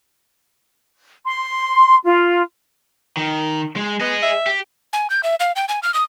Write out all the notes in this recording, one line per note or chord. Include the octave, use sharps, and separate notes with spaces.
C6
F4
D#3
G#3
B3 G#4 D#5
E5
G4
G#5
G6
E5
F5
G5
G#5
F6
D#6